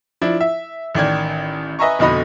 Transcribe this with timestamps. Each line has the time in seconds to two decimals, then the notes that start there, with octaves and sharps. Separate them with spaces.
0.21 F3 D4 E4
0.41 E5
0.95 A1 D#3 D5 G#6
1.79 B4 D#5 E5 G#5 A#5 C#6
1.99 F1 B2 D3 D#4 D#5 B5